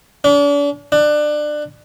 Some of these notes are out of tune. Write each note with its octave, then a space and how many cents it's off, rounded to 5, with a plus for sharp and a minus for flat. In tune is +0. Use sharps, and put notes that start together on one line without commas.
D4 -40
D4 +25